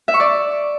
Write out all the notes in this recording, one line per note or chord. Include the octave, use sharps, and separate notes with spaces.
E5
C#6
D5